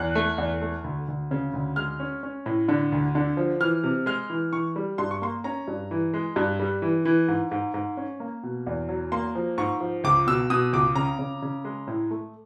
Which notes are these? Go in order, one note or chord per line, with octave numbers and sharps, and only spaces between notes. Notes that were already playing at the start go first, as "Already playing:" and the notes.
Already playing: E2 F#6
A3
E2
A3
D2
D2
C#3
D2
G#3 F6
C#4
C#4
A2
D3
D2
D3
F3
E3 F6
C3
G#3 F6
E3
E3 C#6
G3
G2 C6
C#6
A#3 C6
C#4 A#5
G2
E3
G#3
G2
G3
E3
E3
G#2
G#2
G#2
C#4
A#3
B2
E2
F#3
A#3 C6
F3
G#2 C#6
F3
C#2 D6
B2 E6
B2 D#6
C#2 D6
C#3 A#5
C#3
C#3
G#3
A2
A3